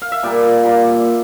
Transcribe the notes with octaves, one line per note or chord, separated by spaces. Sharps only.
F5
E5
A#2 G3 A#3 D5
A#2 G3 A#3